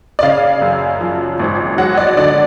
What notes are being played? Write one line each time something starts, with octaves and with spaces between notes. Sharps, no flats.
D5
C#3 F5
F#2
F3
G#1
F#3 F#5
D5
D3 D5